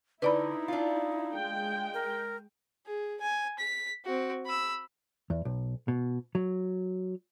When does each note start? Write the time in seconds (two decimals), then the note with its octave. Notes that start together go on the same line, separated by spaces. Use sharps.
0.22 D3 D#4 E4 B4 D5 B5
0.68 D4 F4
1.35 G#3 G5
1.94 A#4
2.87 G#4
3.21 G#5
3.59 B6
4.05 C4 F#4
4.47 B5 E6
5.30 E2
5.45 B1
5.88 B2
6.35 F#3